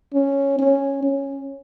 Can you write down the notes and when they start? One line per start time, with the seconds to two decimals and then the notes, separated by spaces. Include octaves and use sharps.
0.14 C#4
0.59 C#4
1.03 C#4